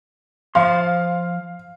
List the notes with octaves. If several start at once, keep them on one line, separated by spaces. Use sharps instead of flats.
F3 F5 C6